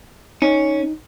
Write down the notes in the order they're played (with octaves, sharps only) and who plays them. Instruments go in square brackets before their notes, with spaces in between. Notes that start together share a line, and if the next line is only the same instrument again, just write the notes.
[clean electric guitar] C#4 [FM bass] D#4